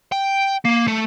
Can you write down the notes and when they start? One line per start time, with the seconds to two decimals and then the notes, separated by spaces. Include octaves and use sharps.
0.12 G5
0.65 A#3
0.88 A3 A4